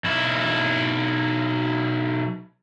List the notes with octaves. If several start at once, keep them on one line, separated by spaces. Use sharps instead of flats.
B1 E4